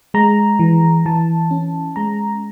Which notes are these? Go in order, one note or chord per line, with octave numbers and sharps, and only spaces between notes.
G#3 A#5
E3
E3 A5
C#4
G#3 A#5